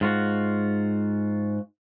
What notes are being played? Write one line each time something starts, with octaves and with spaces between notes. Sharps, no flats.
G#2 F4 F#4